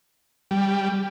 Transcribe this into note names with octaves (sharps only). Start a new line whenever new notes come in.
G3